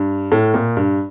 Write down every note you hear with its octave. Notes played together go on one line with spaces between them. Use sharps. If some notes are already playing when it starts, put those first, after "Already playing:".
Already playing: G2
A2
A#2
G2